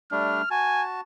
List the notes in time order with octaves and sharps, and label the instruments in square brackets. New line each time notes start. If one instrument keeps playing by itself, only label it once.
[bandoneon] G3 A3 D4 [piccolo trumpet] F6
[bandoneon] F#4 A5 [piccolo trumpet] G#5